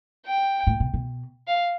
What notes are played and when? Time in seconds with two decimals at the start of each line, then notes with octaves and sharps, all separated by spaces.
0.26 G5
0.67 A2
0.80 B2
0.94 B2
1.47 F5